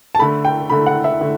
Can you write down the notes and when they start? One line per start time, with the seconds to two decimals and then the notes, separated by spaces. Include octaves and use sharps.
0.15 A5
0.19 D3 A3 B5
0.45 G5
0.70 D3 A3 B5
0.86 F#5
1.04 E5
1.21 D3 A3